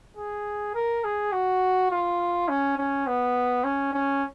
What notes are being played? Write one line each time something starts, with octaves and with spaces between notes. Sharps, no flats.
G#4
A#4
G#4
F#4
F4
C#4
C#4
B3
C#4
C#4